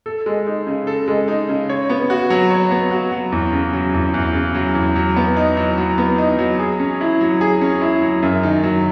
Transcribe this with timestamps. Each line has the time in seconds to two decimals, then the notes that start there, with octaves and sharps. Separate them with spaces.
0.06 A4
0.26 G#3
0.46 D#4
0.67 C#3
0.87 A4
1.08 G#3
1.28 D#4
1.49 C#3
1.69 C#5
1.90 B3
2.10 F#4
2.30 F#3
2.50 C#5
2.71 B3
2.91 F#4
3.12 F#3
3.32 E2
3.53 C#3
3.73 F#3
3.94 E2
4.14 E2
4.34 C#3
4.55 F#3
4.75 E2
4.96 F#3
5.16 B3
5.37 D#4
5.57 F#3
5.78 F#3
5.98 B3
6.18 D#4
6.39 F#3
6.59 G#4
6.80 C#4
7.01 E4
7.21 F#3
7.41 G#4
7.61 C#4
7.81 E4
8.02 F#3
8.22 F#2
8.43 D#3
8.63 F#3